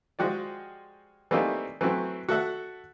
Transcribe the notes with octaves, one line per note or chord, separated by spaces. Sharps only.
F3 G#3 F#4 G4 D5
E3 G3 A3 A#3 C4 D#4
E3 F#3 A3 C4
F#4 A4 E5 F#5